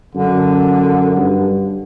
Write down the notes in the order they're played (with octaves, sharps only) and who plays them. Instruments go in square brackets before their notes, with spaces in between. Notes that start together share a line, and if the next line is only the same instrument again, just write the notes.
[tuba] F#2 [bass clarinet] D3
[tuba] G2